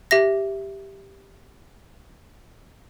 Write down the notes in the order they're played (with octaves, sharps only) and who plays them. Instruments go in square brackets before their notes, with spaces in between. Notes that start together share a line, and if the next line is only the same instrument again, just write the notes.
[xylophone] G4 E5 A#6